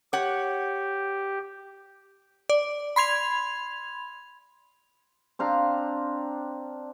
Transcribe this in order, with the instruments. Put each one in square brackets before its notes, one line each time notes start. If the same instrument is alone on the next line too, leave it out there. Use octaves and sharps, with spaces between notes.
[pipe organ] G4 [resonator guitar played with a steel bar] C#5 F#5
[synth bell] D5
B5 C6 G#6 F7
[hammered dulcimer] C4 D4 F5 A#5